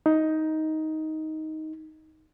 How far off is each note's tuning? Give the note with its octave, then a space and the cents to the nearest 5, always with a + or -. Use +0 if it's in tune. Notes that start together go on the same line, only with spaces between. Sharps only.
D#4 +10